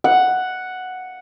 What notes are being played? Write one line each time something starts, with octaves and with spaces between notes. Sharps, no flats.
F#5